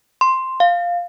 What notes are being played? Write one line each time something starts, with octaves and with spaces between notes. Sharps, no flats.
C6
F5